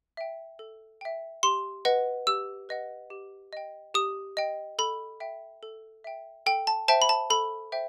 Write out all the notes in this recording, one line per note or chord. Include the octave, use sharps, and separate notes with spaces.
E5 G5
A4
E5 G5
G4 C6
B4 D#5 F#5
G4 E6
B4 D#5 F#5
G4
D#5 G5
G4 D#6
D#5 G5
A4 B5
E5 G5
A4
E5 G5
A4 G5
A5
C5 E5 G5 A5
B5
A5
A4 B5
C5 E5 G5